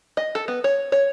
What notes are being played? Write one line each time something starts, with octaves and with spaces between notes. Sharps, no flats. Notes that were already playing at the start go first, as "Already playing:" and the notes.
D#5
A4
B3
C#5
C#5